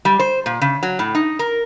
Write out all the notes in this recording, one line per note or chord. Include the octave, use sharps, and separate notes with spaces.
G3
C5
A#2
C#3
F#3
A2
D#4
A#4